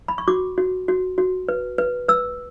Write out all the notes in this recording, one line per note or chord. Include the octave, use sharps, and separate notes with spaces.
B5
C#6
F#4 D6
F#4
F#4
F#4
B4
B4
B4 E6